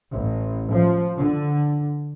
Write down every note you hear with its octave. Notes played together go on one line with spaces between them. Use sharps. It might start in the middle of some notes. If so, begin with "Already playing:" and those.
A1
F3
D3